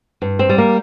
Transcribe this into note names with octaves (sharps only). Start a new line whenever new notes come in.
G2
C4
G3
A#3